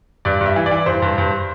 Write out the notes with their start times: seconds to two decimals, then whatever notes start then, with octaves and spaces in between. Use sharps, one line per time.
0.25 G2 D5
0.41 G2
0.46 E5
0.56 E3
0.66 D5
0.71 E3
0.86 G2 C5
1.02 G2
1.18 G2